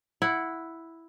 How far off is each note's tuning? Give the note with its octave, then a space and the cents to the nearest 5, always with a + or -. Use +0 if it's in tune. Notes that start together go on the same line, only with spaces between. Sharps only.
E4 +0 F#5 -5